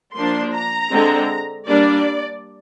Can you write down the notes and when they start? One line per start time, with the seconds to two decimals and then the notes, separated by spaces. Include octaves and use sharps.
0.15 F3 A#3 D4 C6
0.54 A#5
0.92 D3 G#3 C4
1.67 G3 A#3 D4 D5